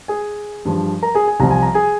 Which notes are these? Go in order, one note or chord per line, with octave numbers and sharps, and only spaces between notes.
G#4 G#5
G2 F3
A#4 A#5
G#4 G#5
G#5
C2 C3 F3 A#5
G#5
A#5
G#4 G#5